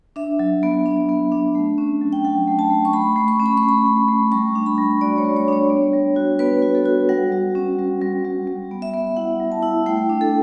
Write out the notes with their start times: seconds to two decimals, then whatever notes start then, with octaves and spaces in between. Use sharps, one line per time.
0.16 D4 E5
0.39 F#3
0.63 B3
0.86 D4
1.09 B3
1.32 D4
1.55 A3
1.78 C#4
2.01 F#3
2.13 G5
2.24 F#3 F#5
2.47 A3
2.59 A5
2.70 A3
2.85 C#6
2.93 A3 B5
3.16 A3
3.28 C#6
3.40 C#4
3.46 B5
3.58 C#6
3.63 A3
3.69 B5
3.86 A3
4.08 A3
4.32 G3 C#6
4.55 D4
4.66 B5
4.78 G3
5.01 F#4 D5
5.18 C#5
5.24 G3
5.36 C#5
5.48 D4 C#5
5.70 B3
5.93 G3
6.16 F#4
6.39 B3 B4
6.62 F#4
6.75 A4
6.86 F#4
7.09 G3 F#5
7.32 G3
7.55 C#4
7.79 G3
8.01 G3
8.25 G3
8.47 G3
8.71 B3
8.82 E5
8.94 B3
9.17 E4 F#5
9.40 G3
9.52 A5
9.62 E4
9.86 A3 G5
10.09 D4
10.21 A4